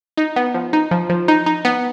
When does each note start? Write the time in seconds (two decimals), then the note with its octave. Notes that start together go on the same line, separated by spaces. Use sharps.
0.17 D#4
0.36 B3
0.54 F3
0.73 D#4
0.91 F3
1.09 F3
1.28 D#4
1.46 D#4
1.65 B3